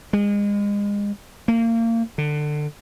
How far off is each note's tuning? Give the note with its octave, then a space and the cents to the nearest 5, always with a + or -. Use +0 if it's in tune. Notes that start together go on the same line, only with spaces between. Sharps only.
G#3 -30
A#3 -30
D3 +25